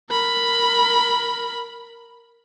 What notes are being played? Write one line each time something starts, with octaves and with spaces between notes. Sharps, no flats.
A#4 B5